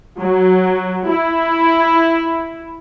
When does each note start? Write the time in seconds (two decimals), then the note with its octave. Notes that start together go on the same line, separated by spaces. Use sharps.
0.18 F#3
1.08 E4